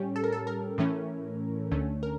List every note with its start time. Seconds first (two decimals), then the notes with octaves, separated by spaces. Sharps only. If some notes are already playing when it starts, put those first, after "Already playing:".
Already playing: A2 G3 C#4 G4
0.16 A4
0.24 A#4
0.32 A4
0.47 A#4
0.78 A2 E3 A3 C#4
1.71 D2 D3 A3 C#4
2.03 A#4